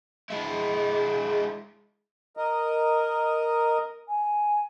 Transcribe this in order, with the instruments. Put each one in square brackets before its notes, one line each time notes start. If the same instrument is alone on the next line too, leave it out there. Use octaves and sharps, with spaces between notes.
[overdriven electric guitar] G#3 E4
[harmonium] A#4 D#5
[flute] G#5